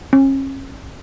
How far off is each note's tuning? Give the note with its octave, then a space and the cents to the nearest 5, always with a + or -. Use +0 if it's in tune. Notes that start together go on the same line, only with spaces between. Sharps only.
C#4 -40